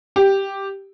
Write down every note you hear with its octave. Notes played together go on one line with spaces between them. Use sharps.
G4